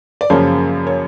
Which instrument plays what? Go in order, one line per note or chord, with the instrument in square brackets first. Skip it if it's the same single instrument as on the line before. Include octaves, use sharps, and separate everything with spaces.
[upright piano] D5
F#2 C#3 F3 A#3 C#5
C#5